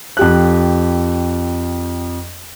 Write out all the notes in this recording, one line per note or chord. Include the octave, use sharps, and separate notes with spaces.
F2 G4 F#6